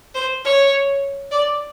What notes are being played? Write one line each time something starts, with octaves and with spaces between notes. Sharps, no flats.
C5
C#5
D5